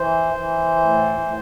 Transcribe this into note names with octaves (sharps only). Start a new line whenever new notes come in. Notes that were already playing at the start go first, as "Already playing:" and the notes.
Already playing: E3 C5
E3
A2
A2